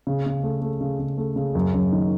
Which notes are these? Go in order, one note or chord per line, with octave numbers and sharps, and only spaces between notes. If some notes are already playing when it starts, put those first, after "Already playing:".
C#3
C#3
A3
A3
C#3
C#3
A3
C#3
F#2
F#2
D#3